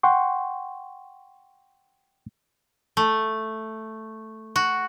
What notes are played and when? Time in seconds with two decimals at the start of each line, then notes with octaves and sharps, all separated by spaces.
0.03 F#5 G5 C6 C#6
2.97 A3
4.56 F#4